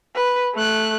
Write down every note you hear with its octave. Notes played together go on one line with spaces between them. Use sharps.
B4
A3 F#6